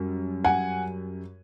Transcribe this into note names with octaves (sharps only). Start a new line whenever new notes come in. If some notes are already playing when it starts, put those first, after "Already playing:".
Already playing: F#2 G3
F#5 G#5